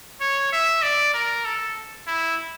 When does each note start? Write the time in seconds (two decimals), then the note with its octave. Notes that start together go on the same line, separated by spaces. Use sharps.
0.21 C#5
0.53 E5
0.83 D5
1.14 A#4
1.45 A4
2.07 E4